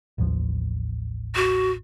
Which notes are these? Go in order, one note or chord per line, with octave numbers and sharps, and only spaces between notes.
A1 D#2 F3
F#4